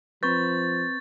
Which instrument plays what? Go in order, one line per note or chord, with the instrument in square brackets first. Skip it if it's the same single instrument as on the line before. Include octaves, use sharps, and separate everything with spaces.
[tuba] F3 [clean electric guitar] C4 B4 [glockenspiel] C#6 G6 [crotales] A6